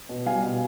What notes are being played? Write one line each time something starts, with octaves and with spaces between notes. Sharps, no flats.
B2
G3 F5 G#5
B2